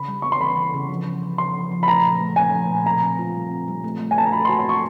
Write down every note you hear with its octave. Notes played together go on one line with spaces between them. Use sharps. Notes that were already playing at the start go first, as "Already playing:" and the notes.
Already playing: C#3 B5
G3
B3 C#6
C6
E3 B5
E3
C#3
F3
C#4
C#3
C#3 C6
F3
F3
B5
A3 A#5
A#2
A3
A#2 G#5
F3
A#2
B2 A#5
C4
F4
G3
C4
G3
A3
A3
G#5
D4 A5
A#5
F#4 B5
C6
F#4
C6
F#4 C#6